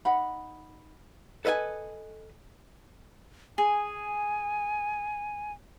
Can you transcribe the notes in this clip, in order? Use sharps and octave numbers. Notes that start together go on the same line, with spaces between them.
D#4 F#5 B5
A4 B4 D#5 F#5 G#5
G#4 G#5